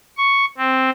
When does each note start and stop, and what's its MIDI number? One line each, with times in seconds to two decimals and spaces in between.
0.18 0.45 85
0.57 0.90 60